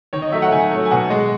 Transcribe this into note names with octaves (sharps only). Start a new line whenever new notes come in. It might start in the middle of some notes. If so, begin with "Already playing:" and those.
D#3 C#5
D#5
F#3 A3 E5
F#5
D#3 G#5
F#3 A3
G#5
B2 F#5
G#3